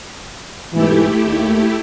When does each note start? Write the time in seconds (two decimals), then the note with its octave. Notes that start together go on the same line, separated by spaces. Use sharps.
0.73 G#2 B2 E3 A3 E4 G4
1.25 D#2